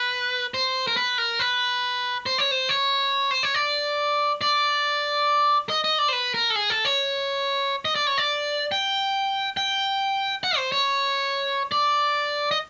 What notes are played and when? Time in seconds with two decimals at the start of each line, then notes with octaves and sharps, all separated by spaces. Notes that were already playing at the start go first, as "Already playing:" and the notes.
Already playing: B4
0.54 C5
0.87 A#4
0.97 B4
1.18 A#4
1.40 B4
2.26 C5
2.38 C#5
2.51 C5
2.69 C#5
3.31 C5
3.43 C#5
3.55 D5
4.41 D5
5.69 D#5
5.84 D#5
5.99 D5
6.08 C5
6.13 B4
6.34 A#4
6.50 A4
6.56 G#4
6.70 A4
6.85 C#5
7.85 D#5
7.95 D5
8.07 C#5
8.18 D5
8.72 G5
9.57 G5
10.44 F#5
10.57 C5
10.72 C#5
11.72 D5
12.51 D#5